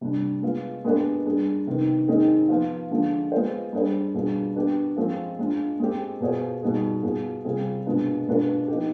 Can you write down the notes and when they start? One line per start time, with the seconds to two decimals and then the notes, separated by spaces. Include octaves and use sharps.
0.01 C3 G3 D4
0.42 G#3 B3 F4
0.84 G#3 B3 D4 G4 B4
1.26 G3 D4 G#4
1.67 C3 D#3 B3
2.08 D#3 G#3 C4 D#4 G#4
2.49 F3 B3 F4
2.91 D3 F3 G#3
3.32 G#3 B3 F4 C5
3.73 G3 D4 G#4 C5
4.14 B2 G3 D4 F4 G#4
4.56 B3 D4 G4
4.96 F3 G#3 C4 F4
5.39 G#3 D4 F4
5.79 G#3 C4 G4
6.21 B2 B3 F4 G#4 C5
6.62 B2 G3 B3 D#4 G#4
7.03 B2 B3 F4 G#4
7.45 C3 G3 C4 F4 G#4
7.86 B2 G#3 B3 D4 F4
8.27 B2 G#3 D4 F4 B4
8.68 F3 B3 D#4 G4